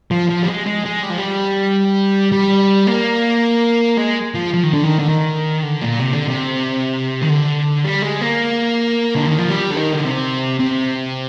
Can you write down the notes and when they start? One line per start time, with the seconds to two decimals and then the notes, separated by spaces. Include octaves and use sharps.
0.11 F3
0.29 F3
0.43 G3
0.49 G#3
0.67 G#3
0.85 G#3
1.03 G3
1.10 F3
1.18 G3
2.32 G3
2.87 A#3
3.97 G#3
4.34 F3
4.54 F3
4.63 D#3
4.73 D3
4.84 D#3
4.99 D3
5.09 D#3
5.63 D3
5.82 A#2
6.00 C3
6.14 D3
6.28 C3
7.22 D#3
7.29 D3
7.84 G3
8.02 G#3
8.21 A#3
9.15 D3
9.27 D#3
9.38 F3
9.50 G3
9.71 D3
9.77 D#3
9.94 D3
10.05 C3
10.60 C3